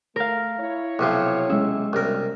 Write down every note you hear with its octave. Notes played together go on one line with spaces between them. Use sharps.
A3 A#4 F5
E4 C#5
B1 C3 F3 E5
G#3 C#4 E5
C2 G2 B2 A#4